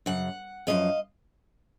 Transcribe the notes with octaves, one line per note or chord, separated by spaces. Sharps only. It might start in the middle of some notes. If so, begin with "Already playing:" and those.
F#2 C#3 F#5
F#2 C#3 F3 D#5 F5